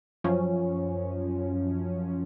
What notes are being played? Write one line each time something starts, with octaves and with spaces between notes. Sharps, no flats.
F#2 F3 C#4